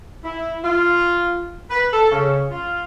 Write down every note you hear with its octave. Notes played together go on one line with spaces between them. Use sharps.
E4
F4
B4
A4
C#3
F4